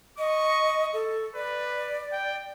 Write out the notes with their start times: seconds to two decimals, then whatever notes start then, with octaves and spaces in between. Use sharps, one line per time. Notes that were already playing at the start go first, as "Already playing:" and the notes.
0.18 D#5 C#6
0.93 A4
1.35 B4 D5
2.12 G5